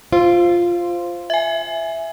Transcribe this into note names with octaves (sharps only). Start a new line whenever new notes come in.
F4 C5
E5 G#5